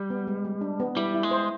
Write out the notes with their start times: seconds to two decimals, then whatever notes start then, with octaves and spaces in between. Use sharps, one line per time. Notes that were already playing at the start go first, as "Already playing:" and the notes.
Already playing: G3
0.10 B3
0.27 G#3
0.45 G#3
0.61 D4
0.80 B3
0.96 G3 E4
1.14 E4
1.23 G#3
1.31 C5